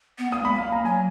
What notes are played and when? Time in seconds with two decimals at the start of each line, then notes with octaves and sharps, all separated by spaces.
0.18 B3
0.32 A#3 D#6
0.43 G#3 B5
0.54 A#3 F5
0.72 A#5
0.85 F#3 G#5